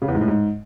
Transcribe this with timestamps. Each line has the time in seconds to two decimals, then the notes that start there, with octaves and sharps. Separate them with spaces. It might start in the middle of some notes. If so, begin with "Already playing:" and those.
0.02 C#3
0.08 E2
0.15 G#2
0.21 A2
0.28 G#2